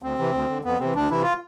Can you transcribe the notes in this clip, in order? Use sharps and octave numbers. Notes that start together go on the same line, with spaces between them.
D2 C4
C3 E3
D2
D3
F2 B3
C3 E3 C4
D2 D4
C3 E3 E4
F4